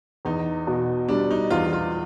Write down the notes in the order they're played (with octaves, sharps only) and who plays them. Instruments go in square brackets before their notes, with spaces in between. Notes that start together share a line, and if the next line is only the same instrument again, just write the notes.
[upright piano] E2 [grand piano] D#4
[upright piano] B2
[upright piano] G3 [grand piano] D4
[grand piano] D#4
[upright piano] E2 [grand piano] F4
[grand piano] F4